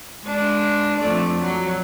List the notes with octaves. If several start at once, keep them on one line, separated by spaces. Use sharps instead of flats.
G#3 D4
F2 A3 D5
F#3